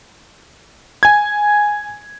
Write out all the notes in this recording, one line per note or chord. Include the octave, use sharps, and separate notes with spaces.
G#5 G#6